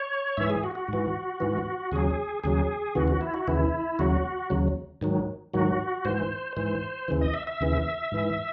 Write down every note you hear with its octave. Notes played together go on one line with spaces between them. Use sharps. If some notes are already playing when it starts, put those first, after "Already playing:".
Already playing: C#5
G#2 E3 E5
G#4
F#4
F#4
G#2 E3
G#2 E3
D#2 C#3 F#3 G#4
D#2 C#3 F#3 G#4
D#2 C#3 E3 F#4
F#4
E4
F#4
D#2 C#3 E3 E4
D#2 C#3 F#3 F#4
D#2 C#3 F#3
G#2 D#3 F#3
G#2 D#3 F#3 F#4
G#2 E3 C5
G#2 E3 C5
D#2 C#3 E3
D#5
E5
E5
D#2 C#3 E3
G#2 E3